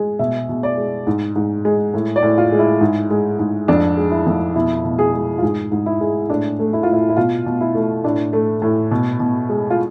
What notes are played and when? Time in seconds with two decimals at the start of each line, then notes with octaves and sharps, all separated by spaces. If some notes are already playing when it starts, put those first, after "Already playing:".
Already playing: G#3
0.19 B2 E5
0.49 B2
0.63 D5
0.77 G#3
1.07 G#2
1.36 G#2
1.65 G#3
1.94 A2
2.16 D5
2.23 A2
2.38 F4
2.52 G#3
2.59 E4
2.81 G#2
3.11 G#3
3.39 G#2
3.68 F2 D4
3.97 G#3
4.11 E4
4.26 F2
4.55 B2 E4
4.84 B2
4.99 G#4
5.13 G#3
5.38 F4
5.43 G#2 G#4
5.72 G#2
5.86 E4
6.01 G#3
6.29 A2 D4
6.59 A3
6.73 E4
6.83 F4
6.88 A2 E4
7.09 E4
7.17 B2 F4
7.46 B2
7.61 E4
7.75 A3
8.04 A2 D4
8.33 A3
8.62 A2
8.91 B2
9.20 B2
9.49 G#3
9.70 F4